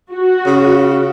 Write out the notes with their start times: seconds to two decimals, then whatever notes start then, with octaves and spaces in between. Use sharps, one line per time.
0.13 F#4
0.46 C#3